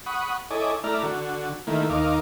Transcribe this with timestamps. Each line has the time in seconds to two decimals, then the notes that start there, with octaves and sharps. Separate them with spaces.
0.06 F#5 B5 C#6 D#6
0.51 E4 A4 C#5 D#5 G#5 D6
0.84 A3 E4 D5 A#5 F6
1.03 D3 F#4
1.67 D#3 A3 A#3 E4
1.90 D#2 D#4 A#4 F5 D6